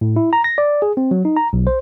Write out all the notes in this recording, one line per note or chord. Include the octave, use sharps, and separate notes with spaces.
A2
E4
A#5
A#6
D5
G#4
C4
F#3
D#4
A#5
B1
C5